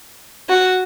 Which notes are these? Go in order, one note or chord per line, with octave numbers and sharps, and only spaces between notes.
F#4